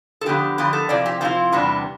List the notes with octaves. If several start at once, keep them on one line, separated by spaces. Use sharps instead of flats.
A4
D3 F3 B3 G4
D3 F3 B3 G4
A4
C3 F3 C4 E4 D5
G4
C3 F3 C4 E4 F4
E2 C3 G3 B3 D4